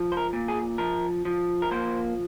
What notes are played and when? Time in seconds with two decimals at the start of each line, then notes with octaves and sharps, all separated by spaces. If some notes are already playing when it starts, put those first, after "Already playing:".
Already playing: F3
0.12 C5
0.17 A#4
0.33 A#2
0.48 G#4
0.78 F3 A#4
1.25 F3
1.62 A#4
1.71 A#3 C5